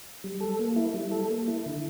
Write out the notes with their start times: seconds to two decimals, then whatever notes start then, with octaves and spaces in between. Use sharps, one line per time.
0.24 G3
0.41 A4
0.59 A#3
0.76 E4
0.94 G3
1.12 A4
1.30 A#3
1.48 E4
1.66 D3